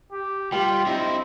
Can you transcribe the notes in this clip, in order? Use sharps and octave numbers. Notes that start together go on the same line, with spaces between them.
G4
G3 F4 G5
C4 D#4 E4